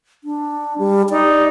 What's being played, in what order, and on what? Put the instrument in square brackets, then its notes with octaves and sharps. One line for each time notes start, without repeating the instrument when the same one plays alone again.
[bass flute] D4
G3
[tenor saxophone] D#4 [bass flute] D5